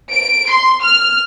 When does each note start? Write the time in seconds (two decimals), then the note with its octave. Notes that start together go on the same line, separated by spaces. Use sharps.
0.12 D7
0.50 C6
0.82 F6